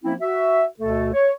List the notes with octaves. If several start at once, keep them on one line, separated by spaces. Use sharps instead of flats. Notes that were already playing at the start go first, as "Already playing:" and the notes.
F3 A#3 C4 C#4 E4
F#4 E5
D2 B2 A3 A4
C#5